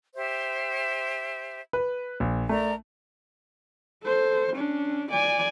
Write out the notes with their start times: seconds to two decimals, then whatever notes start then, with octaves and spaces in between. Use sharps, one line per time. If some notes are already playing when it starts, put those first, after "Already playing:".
0.15 G4 C5 E5
1.73 B4
2.20 A#1
2.49 A3 A#4 D5 A#5
4.03 A4 C5
4.54 C#4 D4
5.11 D5 G#5